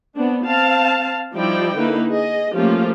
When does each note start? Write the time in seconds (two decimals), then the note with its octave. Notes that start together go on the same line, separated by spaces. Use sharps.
0.15 B3 C4 D4
0.44 C4 F5 A5
1.35 F3 G3 D#4 E4 D5 G5
1.77 D3 A#3 D#4 E4 B4
2.11 G#4 D#5
2.55 F3 A3 A#3 C#4 F4 G4